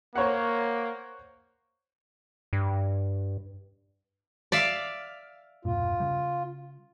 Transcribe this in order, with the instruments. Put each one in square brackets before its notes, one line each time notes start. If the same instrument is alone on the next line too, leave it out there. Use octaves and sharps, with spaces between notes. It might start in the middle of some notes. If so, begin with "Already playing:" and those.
[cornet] A#3 [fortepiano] C5 C#5 F#5
[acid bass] G2
[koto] D5 E5 F5
[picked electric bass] E1 G2 A#2 [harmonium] F4
[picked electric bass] C#3 G3